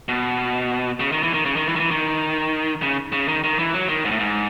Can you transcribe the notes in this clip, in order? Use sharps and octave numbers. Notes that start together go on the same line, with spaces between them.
B2
C#3
D#3
E3
D#3
C#3
D#3
E3
D#3
E3
D#3
C#3
C#3
D#3
D#3
E3
F#3
D#3
G#2
A2
G#2